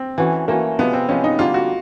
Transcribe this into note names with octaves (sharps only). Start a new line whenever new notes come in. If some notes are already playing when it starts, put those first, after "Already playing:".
Already playing: C4
E3 A3 C#4 F#4
E3 A3 A#3 C#4 F#4
C3 F3 G#3 B3
C4
C3 F3 G#3 C#4
D#4
D3 G3 A#3 F4
F#4